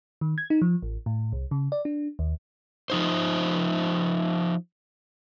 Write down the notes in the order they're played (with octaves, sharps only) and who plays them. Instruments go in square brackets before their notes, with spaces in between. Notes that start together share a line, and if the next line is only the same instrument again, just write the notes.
[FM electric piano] D#3
G#6
D#4
F3
A1
A2
C2
C#3
D5
D4
D#2
[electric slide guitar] F3 D#4 C5